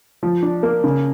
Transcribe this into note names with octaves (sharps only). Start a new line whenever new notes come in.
F3
D4
A#3
C#3